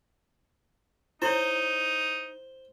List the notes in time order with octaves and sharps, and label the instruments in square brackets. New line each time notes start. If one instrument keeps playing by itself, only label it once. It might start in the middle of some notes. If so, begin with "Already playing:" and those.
[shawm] D#4 [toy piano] E4 C#5 [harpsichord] C5